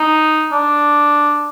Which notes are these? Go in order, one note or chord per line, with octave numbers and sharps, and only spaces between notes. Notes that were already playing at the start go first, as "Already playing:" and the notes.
Already playing: D#4
D4